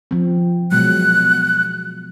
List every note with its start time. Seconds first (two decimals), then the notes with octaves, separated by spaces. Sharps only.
0.11 F3 C4
0.71 B2 F#3 G#3 F#6